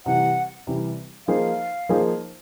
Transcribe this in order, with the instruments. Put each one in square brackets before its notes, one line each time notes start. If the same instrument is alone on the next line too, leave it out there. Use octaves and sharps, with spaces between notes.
[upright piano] C3 E3 G3 [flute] F#5
[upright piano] C3 E3 G3
[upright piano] F3 A#3 D#4 G#4 C5 [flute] F5
[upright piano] F3 A#3 D#4 G#4 C5